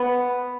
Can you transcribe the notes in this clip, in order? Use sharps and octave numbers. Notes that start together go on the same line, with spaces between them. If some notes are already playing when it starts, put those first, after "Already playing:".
Already playing: B3